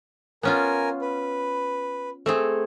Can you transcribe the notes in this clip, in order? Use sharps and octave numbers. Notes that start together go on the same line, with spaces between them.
B3 C#4 F4 A#4 G#5
B4
A3 C4 G#4